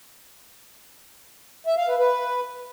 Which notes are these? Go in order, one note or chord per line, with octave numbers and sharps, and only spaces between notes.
E5
F5
B4
B4